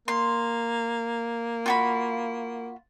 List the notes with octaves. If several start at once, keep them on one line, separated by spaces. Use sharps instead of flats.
A#3 C6
F4 F#4 B5